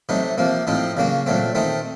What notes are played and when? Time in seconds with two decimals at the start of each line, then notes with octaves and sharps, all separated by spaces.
0.09 C3 F#3 A3 D#4
0.38 C3 F3 A#3
0.67 A2 F3 C4 D#4
0.97 C#3 F#3 A#3 C#4
1.26 A#2 F#3 A3 C4
1.55 D#3 A3 C4 D#4